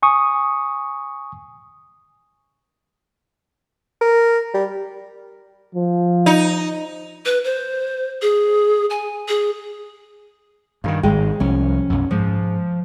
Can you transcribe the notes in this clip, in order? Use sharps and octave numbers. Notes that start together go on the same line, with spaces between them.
G#5 C#6 D#6
A#4
G3
F3
D#4
B4
C5
G#4
G#5
G#4
G2 D3 D#3 F5
G#1 G#3 G#4 G5
C2 F3 C#4
B1 F#2
G#2 F3